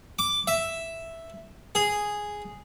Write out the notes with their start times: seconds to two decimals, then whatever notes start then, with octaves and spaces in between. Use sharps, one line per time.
0.19 D6
0.47 E5
1.75 G#4